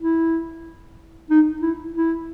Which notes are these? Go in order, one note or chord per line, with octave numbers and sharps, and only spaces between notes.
E4
D#4
E4
E4